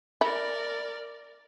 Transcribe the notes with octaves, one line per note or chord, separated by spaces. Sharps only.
E4 A#4 D5